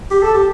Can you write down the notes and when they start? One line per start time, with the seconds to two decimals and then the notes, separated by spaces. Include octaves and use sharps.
0.11 G4
0.22 A4
0.34 G4